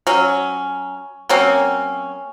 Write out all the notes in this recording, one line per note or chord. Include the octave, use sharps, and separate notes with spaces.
F#3 C#4
F#3 A#3 C4 C#4